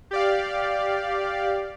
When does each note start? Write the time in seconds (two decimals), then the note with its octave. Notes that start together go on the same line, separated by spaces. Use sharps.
0.11 G4 D5 F5